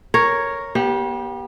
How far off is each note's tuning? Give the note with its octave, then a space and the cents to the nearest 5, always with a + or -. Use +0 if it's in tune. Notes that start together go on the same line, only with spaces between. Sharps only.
A#4 +0 C#5 +0
B3 -40 G4 +0